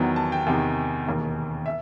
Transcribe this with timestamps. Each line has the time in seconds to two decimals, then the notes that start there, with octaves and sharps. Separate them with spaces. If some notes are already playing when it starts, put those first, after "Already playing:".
Already playing: E2 D#3 F#3 B3
0.16 A5
0.32 G5
0.47 E2 C3 D#3
1.06 E1 D#2 D#3
1.66 E5